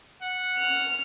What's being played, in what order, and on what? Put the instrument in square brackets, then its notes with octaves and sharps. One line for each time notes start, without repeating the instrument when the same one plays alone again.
[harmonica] F#5
[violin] F6